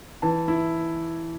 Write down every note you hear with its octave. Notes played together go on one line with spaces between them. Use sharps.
E3 A5
E4